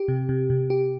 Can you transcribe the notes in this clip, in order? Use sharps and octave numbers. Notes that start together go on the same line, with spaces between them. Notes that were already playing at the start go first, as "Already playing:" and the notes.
Already playing: G4
C3
C3
C3
G4